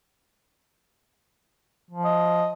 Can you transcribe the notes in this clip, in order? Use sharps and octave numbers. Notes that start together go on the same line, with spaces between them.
F3
D#5